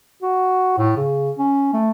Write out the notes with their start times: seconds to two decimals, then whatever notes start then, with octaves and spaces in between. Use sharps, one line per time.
0.22 F#4
0.78 A2
0.97 C#3
1.39 C#4
1.73 A3